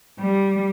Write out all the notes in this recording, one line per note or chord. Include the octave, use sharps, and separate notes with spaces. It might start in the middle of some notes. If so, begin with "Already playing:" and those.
G3